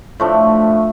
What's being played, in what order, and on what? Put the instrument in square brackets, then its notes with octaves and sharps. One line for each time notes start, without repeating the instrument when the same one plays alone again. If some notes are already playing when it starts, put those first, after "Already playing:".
[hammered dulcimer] A2 F3 A3 D4